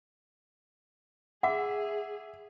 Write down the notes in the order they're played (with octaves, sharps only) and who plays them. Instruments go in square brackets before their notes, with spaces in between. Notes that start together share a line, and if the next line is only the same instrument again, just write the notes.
[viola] G#4 [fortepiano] E5 [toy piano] F#5 D6